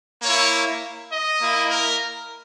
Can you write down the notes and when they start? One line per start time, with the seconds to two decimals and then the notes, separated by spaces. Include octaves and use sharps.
0.22 A#3 E4 C#5
1.10 D#5
1.39 A#3 E4
1.68 A#4